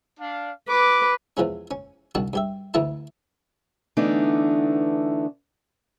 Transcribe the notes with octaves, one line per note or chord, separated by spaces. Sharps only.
D4 F5
B4 D6
E2 E3 F3 G#3 C#4
C#4
C2 D#3 D4 F#4 A5
G2 G4 E5
D2 E3 A3 E4 D#5 A5
D3 E3 A3 B3 D4 D#4